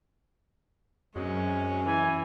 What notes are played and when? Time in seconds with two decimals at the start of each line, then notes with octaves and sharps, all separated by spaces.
1.16 F#2 C3 F#3 G#3 C#4
1.85 E3 G#5